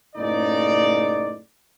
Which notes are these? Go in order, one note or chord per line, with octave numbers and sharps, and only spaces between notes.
F#1 A2 C#3 D#4 D5